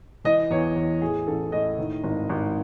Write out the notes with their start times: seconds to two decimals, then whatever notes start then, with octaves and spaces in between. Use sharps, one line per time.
0.24 E3 D#5
0.50 E2 C#5
0.76 E2
1.01 A2 G#4
1.27 A1 A4
1.52 A2 D#5
1.78 D#3
2.03 G#1
2.29 G#1